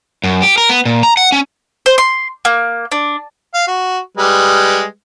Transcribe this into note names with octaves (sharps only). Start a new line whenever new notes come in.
F#2
G4
A#4
B3
A#2
A#5
F#5
C#4
C5
C6
A#3
D4
F5
F#4
G3 G#3 B4